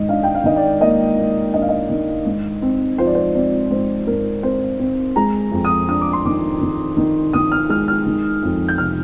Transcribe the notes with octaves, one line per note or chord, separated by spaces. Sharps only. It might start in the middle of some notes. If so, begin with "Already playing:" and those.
Already playing: G#2 D#3 D#5
D4 F5
G5
F5
D#3 D#5
D5
A#3 D#5
A#3
D4 D#5
F5
D#5
D#3
G#2
C4
F3 C5
D5
C5
C4 D5
G#2 C5
G#2 A#4
C4 C5
C4
G#3 A#5
F2
D#6
D4 D#6
D6
C6
D#3 D6
D#3
D#3
D#3 D#6
F6
G#3 F6
F6
D#3
F2
G6
C3 F6